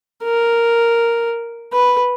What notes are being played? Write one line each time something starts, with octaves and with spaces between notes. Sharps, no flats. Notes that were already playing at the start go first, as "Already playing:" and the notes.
A#4
B4